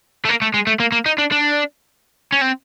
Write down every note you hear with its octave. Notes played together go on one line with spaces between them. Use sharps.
A3
A#3
A3
G#3
A3
A#3
A#3
D#4
D4
D4
C#4
C4